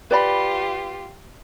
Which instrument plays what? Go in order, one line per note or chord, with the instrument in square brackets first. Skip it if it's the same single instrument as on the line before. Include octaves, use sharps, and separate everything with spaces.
[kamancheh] F4 G4 [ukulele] B4 D5 B5